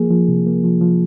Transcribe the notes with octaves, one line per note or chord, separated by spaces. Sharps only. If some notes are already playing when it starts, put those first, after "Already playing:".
Already playing: F3 A#3 G#4
F3
C3
A#3
F3
F3